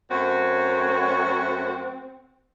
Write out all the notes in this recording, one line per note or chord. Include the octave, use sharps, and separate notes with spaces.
F#2 A3 C4 F#4 C#5